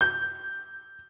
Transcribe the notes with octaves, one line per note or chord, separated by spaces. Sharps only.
G6